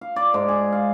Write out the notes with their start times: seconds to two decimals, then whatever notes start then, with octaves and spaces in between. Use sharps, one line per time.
0.01 F5
0.16 D5
0.34 G#2
0.48 G#4
0.72 F5